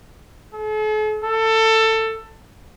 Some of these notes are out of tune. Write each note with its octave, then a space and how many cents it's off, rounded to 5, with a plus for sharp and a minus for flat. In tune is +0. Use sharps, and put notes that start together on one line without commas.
A4 -45
A4 +20